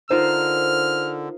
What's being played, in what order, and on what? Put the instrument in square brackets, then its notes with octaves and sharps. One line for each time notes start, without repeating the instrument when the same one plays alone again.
[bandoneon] D3 [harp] D#4 F4 A#4 [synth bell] C5 [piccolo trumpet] F6